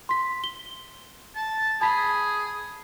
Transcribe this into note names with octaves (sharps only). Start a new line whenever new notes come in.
C6 B6
G7
A5
G#4 A5 B5 B6